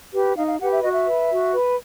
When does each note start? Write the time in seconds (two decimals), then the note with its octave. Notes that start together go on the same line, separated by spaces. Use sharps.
0.13 G4 B4
0.36 D#4 F5
0.48 F5
0.60 G4 B4 F#5
0.71 E5
0.83 F#4 D#5
0.93 E5
1.07 B4
1.31 F#4
1.53 B4